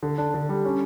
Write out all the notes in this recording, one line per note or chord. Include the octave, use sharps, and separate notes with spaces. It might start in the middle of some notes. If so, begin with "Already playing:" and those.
D3
D4
D3
G3
C#4